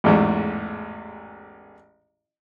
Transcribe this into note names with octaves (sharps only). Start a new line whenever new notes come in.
A1 E2 G#2